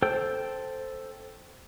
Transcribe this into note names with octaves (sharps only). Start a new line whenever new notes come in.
A4 C5 G5 E6